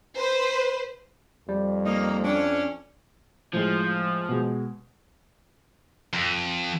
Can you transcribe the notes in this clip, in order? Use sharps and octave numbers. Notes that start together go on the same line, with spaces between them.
B4 C5
F2 G3
A#3 D#4
C#4 D4
A2 F3 G#3
B2 G#3
F2